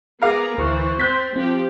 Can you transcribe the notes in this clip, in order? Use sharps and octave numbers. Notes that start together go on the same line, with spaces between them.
B3 G#4 A#4 F5 A#5 D6
D2 E3 C5 C#6 F#6
C4 C6 F#6 G6 A6 B6
F3 C4 G4